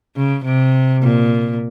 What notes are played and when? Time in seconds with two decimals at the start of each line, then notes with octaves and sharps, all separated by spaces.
0.16 C#3
0.45 C3
1.03 A#2